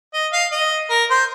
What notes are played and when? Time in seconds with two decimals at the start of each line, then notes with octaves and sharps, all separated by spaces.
0.14 D#5
0.32 F5
0.51 D#5
0.90 A#4
1.10 C5